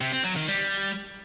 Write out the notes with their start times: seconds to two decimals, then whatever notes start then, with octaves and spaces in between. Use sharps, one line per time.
0.01 C3
0.13 C4
0.24 F#3
0.36 D#3
0.48 G3